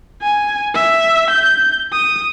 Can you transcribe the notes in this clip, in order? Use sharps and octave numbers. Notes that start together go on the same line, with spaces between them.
G#5
E5
G6
D#6